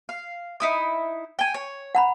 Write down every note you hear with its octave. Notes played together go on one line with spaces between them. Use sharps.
F5
D#4 E4 D#6
G5 G#5
C#5
F#5 A#5 B5